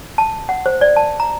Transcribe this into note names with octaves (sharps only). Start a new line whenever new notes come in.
A5
F#5
C5
D5
A5
A#5